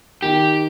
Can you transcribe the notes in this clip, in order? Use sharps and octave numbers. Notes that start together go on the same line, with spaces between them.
D#3 G4